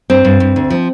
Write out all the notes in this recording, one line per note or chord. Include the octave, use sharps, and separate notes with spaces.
G2 C4
G2
G2
D2
F3